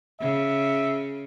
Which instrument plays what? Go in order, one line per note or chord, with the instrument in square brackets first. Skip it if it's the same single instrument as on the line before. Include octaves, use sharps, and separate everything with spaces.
[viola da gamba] C#3 [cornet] E5